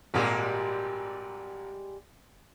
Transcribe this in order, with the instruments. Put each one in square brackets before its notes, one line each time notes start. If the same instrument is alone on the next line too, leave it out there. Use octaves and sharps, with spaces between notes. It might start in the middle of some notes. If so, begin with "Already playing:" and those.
[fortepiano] G#1 A#2 [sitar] G3 G#3 G4